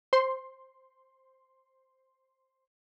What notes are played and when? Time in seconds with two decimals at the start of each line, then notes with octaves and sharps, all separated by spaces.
0.13 C5 C6